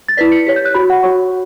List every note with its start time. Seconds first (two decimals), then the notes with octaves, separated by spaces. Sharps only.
0.08 A6
0.17 E4 B4 D5 B6
0.32 C#7
0.46 G4 C#5 B6
0.56 G6
0.65 F#6
0.75 F#4 C#5 B5
0.90 F#5
1.03 F#4 C#5 C#6